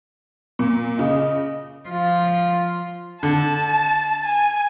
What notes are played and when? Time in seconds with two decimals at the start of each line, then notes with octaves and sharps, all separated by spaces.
0.59 A#2
0.99 C#3 D#5
1.89 F3 F4
3.23 D3 A5
4.24 G#5